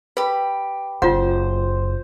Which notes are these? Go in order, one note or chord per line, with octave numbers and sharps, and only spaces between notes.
G4 B4 B5
F#1 F4 C5 F#5